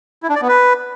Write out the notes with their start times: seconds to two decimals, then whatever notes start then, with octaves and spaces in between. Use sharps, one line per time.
0.23 E4
0.29 D4
0.35 D5
0.42 B3
0.48 B4